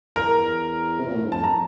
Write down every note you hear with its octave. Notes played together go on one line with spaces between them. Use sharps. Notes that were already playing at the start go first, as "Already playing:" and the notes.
E2 A#4 A#5
C3
A#2
A2
G2
F2 A5
A#5